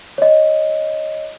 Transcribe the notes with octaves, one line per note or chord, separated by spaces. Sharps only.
C#5 D#5